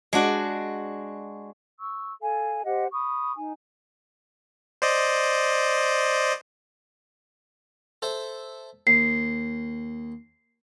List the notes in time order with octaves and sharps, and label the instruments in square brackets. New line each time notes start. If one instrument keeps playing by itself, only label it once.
[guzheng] G#3 D4 F#4 D5
[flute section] C#6 E6
A4 F5 G#5
G4 C5 D#5 F#5
B5 C#6 D#6
D#4 G#5
[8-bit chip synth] C5 D5 D#5
[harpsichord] A4 C5 E5
[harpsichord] D#2 [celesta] C7